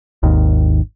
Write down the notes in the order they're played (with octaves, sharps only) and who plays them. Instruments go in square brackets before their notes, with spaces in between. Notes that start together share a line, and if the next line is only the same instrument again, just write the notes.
[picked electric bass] G#1 D#2 D#3